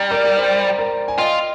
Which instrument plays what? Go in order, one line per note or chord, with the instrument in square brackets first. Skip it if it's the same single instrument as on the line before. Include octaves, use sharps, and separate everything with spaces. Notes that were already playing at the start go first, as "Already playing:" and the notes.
Already playing: [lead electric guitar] G3 [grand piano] G5 A#5
[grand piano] A#4 D5
A#4
C5
A#4
G#5
[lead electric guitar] F4 [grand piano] D#5 G5